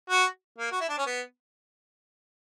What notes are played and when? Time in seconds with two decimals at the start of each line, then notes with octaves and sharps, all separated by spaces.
0.10 F#4
0.58 A#3
0.72 F#4
0.81 E4
0.89 D4
0.98 C#4
1.06 B3